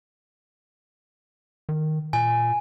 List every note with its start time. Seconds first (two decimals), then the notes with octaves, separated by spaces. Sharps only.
1.69 D#3
2.13 A#2 G#5